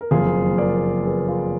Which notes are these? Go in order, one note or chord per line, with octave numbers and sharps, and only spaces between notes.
A#4
F#1 F2 F3 A#3 F4 G#4
A#4 D5
G#4 B4
F4 G#4